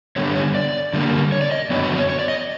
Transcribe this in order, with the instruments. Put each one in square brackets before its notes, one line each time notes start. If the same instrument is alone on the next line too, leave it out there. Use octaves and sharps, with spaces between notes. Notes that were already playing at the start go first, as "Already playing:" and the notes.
[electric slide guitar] D3 G3 B3 C#5
C#5
D5
D3 G3 A#3
C#5
D5
D#5
F#2 D3 F#3 B3 C#5
C#5
C#5
C#5
D5
D#5